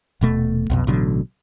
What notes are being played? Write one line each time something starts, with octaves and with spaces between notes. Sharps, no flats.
D#1 B2 A3
B1 F2 B2
A1 B2 D3 F#3